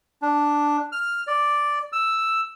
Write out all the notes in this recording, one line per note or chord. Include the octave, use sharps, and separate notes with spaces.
D4
F6
D5
E6